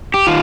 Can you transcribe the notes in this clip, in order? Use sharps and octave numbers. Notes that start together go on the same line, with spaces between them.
G4
D#3 F4